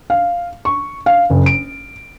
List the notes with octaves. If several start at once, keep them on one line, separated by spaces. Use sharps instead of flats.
F5
C#6
F5
F#1
D7